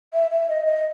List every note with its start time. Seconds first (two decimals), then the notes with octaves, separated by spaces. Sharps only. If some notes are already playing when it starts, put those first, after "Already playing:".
0.13 E5
0.30 E5
0.49 D#5
0.65 D#5